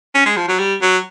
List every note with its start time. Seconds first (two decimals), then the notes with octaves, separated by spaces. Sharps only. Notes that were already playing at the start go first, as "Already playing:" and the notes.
0.15 C#4
0.26 G#3
0.37 F3
0.48 F#3
0.59 G3
0.82 F#3